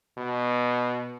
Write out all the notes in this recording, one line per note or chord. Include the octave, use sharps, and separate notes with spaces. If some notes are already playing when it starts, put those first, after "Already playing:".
B2